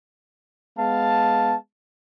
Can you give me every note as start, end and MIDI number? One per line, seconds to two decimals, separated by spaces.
0.78 1.55 56
0.78 1.55 59
0.78 1.55 77
0.78 1.55 81